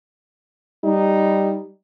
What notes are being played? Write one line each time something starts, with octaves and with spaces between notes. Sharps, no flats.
G3 D#4